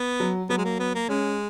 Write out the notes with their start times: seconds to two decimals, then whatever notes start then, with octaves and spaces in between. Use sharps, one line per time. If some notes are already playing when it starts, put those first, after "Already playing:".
Already playing: B3
0.20 F#3
0.49 F#3 B3
0.58 G#3
0.64 A#3
0.79 B3
0.94 A#3
1.09 G#3 C#4